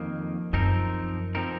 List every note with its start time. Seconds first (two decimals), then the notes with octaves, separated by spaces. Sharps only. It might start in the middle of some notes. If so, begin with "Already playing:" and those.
Already playing: F2 D#3 A#3
0.53 F#2 F3 C4 D#4 A#4
1.35 F3 C4 D#4 A#4